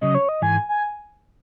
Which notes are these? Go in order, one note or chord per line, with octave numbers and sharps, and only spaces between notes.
C#3 F#3 C#4 D#5
C#5
D#5
G#2 E3 G#3 G#5
G#5